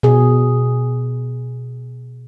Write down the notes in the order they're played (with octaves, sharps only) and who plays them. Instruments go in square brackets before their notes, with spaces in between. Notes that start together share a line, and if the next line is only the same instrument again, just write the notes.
[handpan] B2 G#4